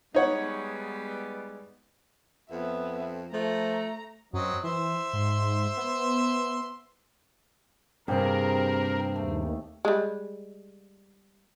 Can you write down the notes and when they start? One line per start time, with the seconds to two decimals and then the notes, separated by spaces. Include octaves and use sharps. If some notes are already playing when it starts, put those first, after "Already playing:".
0.15 G3 G#3 B3 D#4 C#5 F#5
2.51 F2 B3 E5
3.33 F3 A3 A#5
4.33 F#2 F#3 C4 D#5
4.64 E3 C5 E5 C6
5.13 G#2
5.77 B3
8.08 G2 C3 A#3 C4 G4 G#4 A#4
9.16 D#2 A3
9.85 G3 G#3